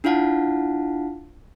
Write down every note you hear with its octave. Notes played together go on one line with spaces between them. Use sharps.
D4 E4 F4 F5 F#5 A5